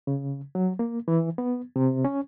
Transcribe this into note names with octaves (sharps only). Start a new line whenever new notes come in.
C#3
F#3
A#3
E3
B3
C3
C#4